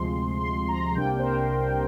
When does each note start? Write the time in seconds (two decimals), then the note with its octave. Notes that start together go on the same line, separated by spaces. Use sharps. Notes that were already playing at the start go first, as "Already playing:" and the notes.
Already playing: D2 C3 F3 G#3 C6
0.40 C6
0.68 A#5
0.95 C2 C3 G3 A#3 D4 G5
1.19 C5
1.23 A#4